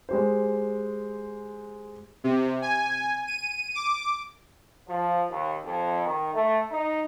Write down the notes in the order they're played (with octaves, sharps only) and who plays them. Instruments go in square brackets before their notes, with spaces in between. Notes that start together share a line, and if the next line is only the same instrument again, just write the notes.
[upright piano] G#3 G4 C5
[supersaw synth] C3
G#5
D#7
D6
[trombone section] F3
D#2
F2
D#3
A3
D#4